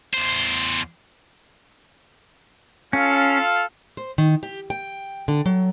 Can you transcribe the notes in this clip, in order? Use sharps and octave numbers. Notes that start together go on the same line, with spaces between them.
E2 C5
C#4 F4 A4 F5
C5
D#3
G4
G5
D3
F#3